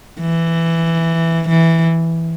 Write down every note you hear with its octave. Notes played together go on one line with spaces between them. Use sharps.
E3
E3